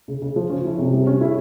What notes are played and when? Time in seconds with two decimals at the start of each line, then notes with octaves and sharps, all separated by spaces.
0.08 C#3
0.22 C#3
0.36 F3
0.50 C#4
0.65 E4
0.78 C3
0.93 G3
1.07 C#4
1.21 E4